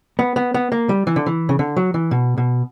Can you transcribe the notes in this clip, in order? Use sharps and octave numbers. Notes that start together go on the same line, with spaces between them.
B3
B3
B3
A#3
G3
E3
D3
E3
C#3
D3
F#3
E3
B2
B2